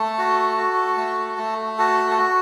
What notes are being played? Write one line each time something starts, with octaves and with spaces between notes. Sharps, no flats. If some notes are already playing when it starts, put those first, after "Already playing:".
Already playing: A3 A4
F#4
F#4
A3
A3
F#4 A4
A4
F#4